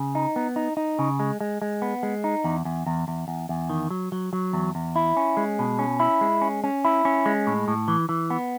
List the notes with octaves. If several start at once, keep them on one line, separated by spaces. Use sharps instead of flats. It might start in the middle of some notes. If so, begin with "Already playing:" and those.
Already playing: C#3
D#4
B3
D#4
D#4
C#3
G#3
G#3
G#3
B3
G#3
D#4
E2
E2
E2
E2
E2
E2
D#3
F#3
F#3
F#3
E2
E2
E4
C#4
G#3
B2
C#4
E4
G#3
C#4
C#4
E4
C#4
G#3
A2
A2
E3
E3
B3